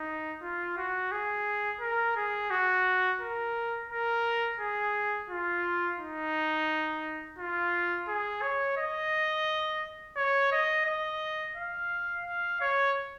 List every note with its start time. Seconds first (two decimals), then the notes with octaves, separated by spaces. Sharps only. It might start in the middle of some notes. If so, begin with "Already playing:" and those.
Already playing: D#4
0.41 F4
0.77 F#4
1.12 G#4
1.81 A#4
2.16 G#4
2.50 F#4
3.21 A#4
3.90 A#4
4.60 G#4
5.30 F4
5.99 D#4
7.39 F4
8.08 G#4
8.42 C#5
8.77 D#5
10.17 C#5
10.52 D#5
10.86 D#5
11.56 F5
12.25 F5
12.61 C#5